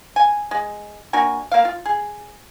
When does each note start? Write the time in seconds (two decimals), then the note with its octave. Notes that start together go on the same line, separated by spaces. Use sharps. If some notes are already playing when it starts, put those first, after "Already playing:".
0.16 G#5
0.51 G#3
1.13 A#3 D4 F#4 G#5
1.52 A#3 F5
1.65 F4
1.86 G#4